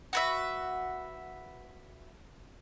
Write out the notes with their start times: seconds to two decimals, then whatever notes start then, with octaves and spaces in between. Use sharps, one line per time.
0.13 F#4 B4 E5